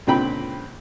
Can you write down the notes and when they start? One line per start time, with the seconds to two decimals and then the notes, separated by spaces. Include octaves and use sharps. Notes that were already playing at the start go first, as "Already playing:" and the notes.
0.07 C#2 A#2 D3 C4 G5 B5